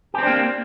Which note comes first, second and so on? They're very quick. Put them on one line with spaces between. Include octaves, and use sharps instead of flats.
G4 C4 D4 A#3